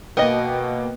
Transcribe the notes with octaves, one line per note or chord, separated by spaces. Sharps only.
B2 A#3 B3 D#5 G5